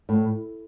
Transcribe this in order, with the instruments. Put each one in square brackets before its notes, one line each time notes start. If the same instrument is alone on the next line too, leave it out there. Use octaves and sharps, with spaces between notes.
[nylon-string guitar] A2